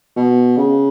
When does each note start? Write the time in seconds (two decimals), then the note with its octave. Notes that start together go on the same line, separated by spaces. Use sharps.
0.16 B2
0.58 C#3